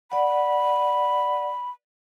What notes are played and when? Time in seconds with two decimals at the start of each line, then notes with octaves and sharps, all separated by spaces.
0.12 D5 F#5 B5